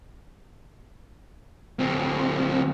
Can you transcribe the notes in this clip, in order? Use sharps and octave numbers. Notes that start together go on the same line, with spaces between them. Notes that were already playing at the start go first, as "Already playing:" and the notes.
D2 C4